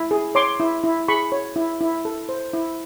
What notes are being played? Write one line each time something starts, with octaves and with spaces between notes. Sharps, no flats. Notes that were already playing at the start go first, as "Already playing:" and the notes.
Already playing: E4
G#4
C#5 C6 D6
E4
E4
G#4 B5 C#6
C#5
E4
E4
A4
C5
E4